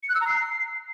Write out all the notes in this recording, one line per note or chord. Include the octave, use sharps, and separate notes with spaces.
C#7
F#6
E6
A#5
C7